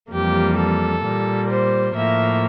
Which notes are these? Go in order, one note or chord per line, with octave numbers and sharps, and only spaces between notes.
F2 E3 G3 A#3 G4
A4
A#2 G3 A#3
C5
A2 F3 A#3 E5